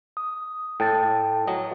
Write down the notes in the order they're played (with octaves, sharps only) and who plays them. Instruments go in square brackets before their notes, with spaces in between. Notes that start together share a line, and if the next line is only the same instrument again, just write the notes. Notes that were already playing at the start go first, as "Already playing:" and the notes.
[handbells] D#6
[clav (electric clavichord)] A2 [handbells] G5 A5 A6
[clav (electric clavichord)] F#3 D#5